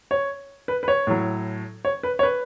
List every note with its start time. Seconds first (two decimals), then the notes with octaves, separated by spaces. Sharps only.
0.11 C#5
0.68 B4
0.83 B4
0.88 C#5
1.07 A2 F#3
1.85 C#5
2.03 B4
2.19 C#5
2.23 B4